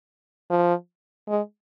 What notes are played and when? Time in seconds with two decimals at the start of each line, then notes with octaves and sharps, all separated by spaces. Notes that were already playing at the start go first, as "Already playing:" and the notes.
0.50 F3
1.28 G#3